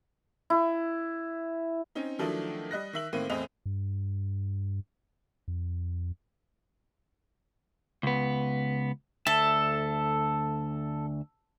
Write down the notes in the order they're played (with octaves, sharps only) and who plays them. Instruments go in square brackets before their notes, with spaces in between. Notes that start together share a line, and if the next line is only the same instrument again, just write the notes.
[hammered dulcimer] E4
[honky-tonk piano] C4 C#4 D#4
D#3 F3 F#3 A3 D4 E4
G3 D#5 F#6 A#6
D#3 E5 F#7
A2 D#3 A#3 C4 D#7
E2 A2 C4 D#5 F7
[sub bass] G2
F2
[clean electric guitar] C#2 B3
[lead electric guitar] D2 E5 [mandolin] A4